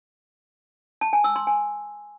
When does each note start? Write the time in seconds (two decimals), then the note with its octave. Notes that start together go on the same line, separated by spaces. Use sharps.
1.01 A5
1.13 G#5
1.24 E6
1.36 C6
1.47 G#5